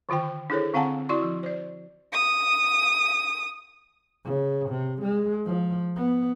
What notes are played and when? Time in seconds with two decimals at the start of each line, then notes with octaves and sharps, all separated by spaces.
0.09 D3 D#3 F4 C5 G5
0.50 D4 E4 G#4 A4 C5 C#5
0.74 D3 C4 F5 F#5 G#5 A5
1.09 E4 F#4 D5 C6 C#6
1.22 F3
1.43 C5 D5
2.13 D#6
4.24 C#3
4.69 C3
5.02 G#3
5.45 F3
5.96 B3